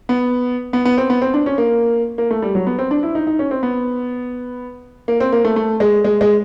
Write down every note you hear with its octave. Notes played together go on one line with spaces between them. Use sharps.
B3
B3
B3
C4
B3
C4
D4
C#4
A#3
A#3
A3
G3
F#3
B3
C4
D4
E4
D#4
D#4
C#4
C4
B3
A#3
C4
A#3
A3
A3
G#3
G#3
G#3